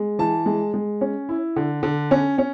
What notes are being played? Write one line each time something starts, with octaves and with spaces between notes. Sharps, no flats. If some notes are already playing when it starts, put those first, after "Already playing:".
Already playing: G#3
E3 A5
G#3
G#3
C#4
E4
D3
D3
C#4
C#4